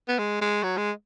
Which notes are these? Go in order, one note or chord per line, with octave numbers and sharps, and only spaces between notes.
B3
G#3
G#3
F#3
G#3